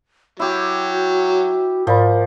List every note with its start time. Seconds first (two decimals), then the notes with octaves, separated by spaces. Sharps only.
0.39 F#3 E4 F#4 G4
1.87 G#2 F3 A#4 D5 B5